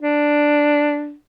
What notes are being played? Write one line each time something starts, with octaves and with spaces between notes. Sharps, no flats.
D4